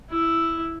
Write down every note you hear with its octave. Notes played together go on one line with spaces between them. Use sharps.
E4